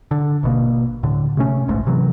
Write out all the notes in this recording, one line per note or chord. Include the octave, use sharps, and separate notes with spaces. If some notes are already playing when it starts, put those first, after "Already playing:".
D3
G#1 B2 A#3
D1 A2 D3
C3 A3 C#4
D1 A1 G#2 A3
C3 E3 F#3